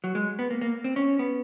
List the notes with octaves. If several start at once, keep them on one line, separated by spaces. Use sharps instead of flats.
F#3
G#3
B3
A#3
A#3
C4
C#4
B3